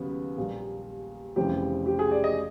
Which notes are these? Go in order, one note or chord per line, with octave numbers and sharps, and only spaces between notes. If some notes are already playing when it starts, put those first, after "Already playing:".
Already playing: D#2 C#3 F#3 B3
A#1 A#2 G3 A#3
F1 F2 C#3 E3 G3 G4
G4
G#4
D5
D#5